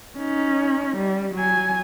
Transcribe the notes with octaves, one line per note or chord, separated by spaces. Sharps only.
C#4 D#4
G3
F#3 G#5